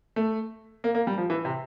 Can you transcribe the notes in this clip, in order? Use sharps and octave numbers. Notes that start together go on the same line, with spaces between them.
A3
A#3
A#3
G3
F3
E3
C3